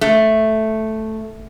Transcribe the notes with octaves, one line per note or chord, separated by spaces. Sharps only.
A3